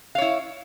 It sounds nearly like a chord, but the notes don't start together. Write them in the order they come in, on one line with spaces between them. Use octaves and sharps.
F5 C#5 E4